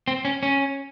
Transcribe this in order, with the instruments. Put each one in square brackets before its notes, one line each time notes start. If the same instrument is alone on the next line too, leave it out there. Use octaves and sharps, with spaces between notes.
[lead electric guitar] C4
C#4
C#4